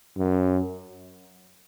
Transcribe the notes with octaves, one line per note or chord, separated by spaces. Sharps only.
F#2